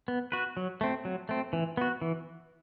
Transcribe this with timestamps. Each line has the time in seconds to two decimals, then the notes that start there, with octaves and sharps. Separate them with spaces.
0.08 B3
0.32 F#4 B4
0.57 F#3
0.81 A3 C4
1.05 F#3
1.29 A3 C4
1.53 E3
1.77 B3 F#4
2.02 E3